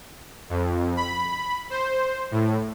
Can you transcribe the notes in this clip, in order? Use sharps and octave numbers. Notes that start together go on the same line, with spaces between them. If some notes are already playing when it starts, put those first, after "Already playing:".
F2
B5
C5
A2